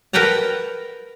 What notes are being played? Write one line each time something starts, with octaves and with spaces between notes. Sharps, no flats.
A#4 B4 F#5 G5 A5 A#5